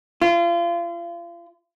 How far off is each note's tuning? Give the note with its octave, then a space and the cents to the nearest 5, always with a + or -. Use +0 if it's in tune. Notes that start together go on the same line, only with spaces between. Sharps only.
F4 -35